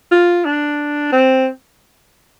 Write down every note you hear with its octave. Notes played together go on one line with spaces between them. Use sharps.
F4
D4
C4